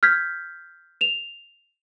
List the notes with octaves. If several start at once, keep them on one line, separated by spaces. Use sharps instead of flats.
F6 G6 G#6 B6
E7 F7